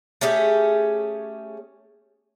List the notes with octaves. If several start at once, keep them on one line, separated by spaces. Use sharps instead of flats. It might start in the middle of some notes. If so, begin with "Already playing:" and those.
A3 C#4 G4 G#4